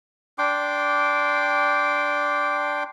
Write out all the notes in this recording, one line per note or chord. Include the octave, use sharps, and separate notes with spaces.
D4 G5 C6 D6